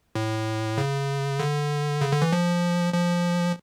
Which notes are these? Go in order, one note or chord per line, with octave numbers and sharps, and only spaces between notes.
A2
C#3
D3
C#3
D3
E3
F3
F3